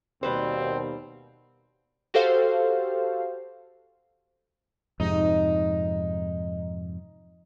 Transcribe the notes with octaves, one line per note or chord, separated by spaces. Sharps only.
D#2 B2 G3 C4 B4 C5
F#4 G4 A4 C5 F5
F2 G#2 C3 D#4